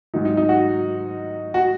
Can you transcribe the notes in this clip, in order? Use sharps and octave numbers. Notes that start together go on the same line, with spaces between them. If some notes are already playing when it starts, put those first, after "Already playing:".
G#2 D#3 F#3 D#4
D#4
D#4
F#4
F#4